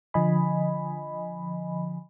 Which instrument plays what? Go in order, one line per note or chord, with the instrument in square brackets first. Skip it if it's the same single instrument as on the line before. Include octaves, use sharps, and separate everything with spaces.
[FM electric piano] D3 F3 D#5 G#5 B5